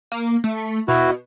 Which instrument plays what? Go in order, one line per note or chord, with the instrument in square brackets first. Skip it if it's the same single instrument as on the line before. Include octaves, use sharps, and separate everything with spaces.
[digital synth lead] A#3
A3
[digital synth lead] B2 [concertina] E4 F#4